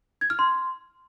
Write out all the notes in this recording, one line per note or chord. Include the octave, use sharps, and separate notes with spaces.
G#6
F6
C6